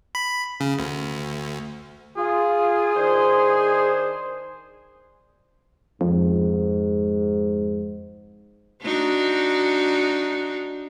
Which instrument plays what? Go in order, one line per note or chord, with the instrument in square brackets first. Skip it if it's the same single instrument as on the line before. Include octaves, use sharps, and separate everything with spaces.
[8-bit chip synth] B5
C#3
D2
[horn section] F4 [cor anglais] G#4
[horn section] D#3 D4 C5
[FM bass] F2 [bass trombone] G#2
[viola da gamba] D4 D#4 F#4